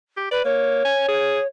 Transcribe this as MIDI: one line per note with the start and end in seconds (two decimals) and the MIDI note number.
0.17 0.30 67
0.31 0.44 71
0.31 0.42 74
0.45 0.81 58
0.45 1.46 73
0.85 1.08 80
1.08 1.39 68